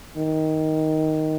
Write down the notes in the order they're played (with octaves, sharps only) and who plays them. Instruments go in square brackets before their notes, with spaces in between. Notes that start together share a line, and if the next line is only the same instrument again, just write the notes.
[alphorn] D#3